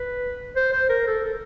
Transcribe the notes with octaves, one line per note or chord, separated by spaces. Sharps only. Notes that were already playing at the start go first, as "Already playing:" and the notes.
Already playing: B4
C5
C5
A#4
A4
A4